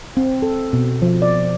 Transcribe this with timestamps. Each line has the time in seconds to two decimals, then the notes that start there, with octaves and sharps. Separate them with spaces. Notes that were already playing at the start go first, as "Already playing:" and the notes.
0.17 C4
0.42 A4
0.73 B2
1.02 F3
1.22 D5